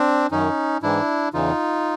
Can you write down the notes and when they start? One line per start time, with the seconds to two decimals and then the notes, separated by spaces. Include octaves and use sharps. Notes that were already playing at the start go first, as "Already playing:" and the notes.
Already playing: C4 D4
0.31 F#2 D#3 C#4 D#4
0.82 G#2 E3 D4 E4
1.33 E2 C#3 E3 D#4 F4